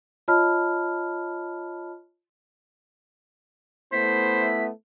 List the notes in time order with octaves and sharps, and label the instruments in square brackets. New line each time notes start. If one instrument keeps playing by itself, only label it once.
[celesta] F4 C#5 D#5 A5 B5 F6
[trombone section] A3 B3 E4 [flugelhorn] C5 [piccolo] B6